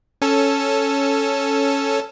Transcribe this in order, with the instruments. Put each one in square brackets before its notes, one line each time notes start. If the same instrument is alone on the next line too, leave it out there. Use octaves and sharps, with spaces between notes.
[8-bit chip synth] C#4 A4